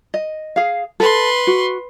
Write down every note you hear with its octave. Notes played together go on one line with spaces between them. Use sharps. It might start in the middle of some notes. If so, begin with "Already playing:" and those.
D#5
G#4 F5
A4 B4 C6
F#4